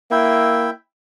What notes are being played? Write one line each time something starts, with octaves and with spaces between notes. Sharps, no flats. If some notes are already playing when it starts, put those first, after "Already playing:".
A#3 E4 E5 G5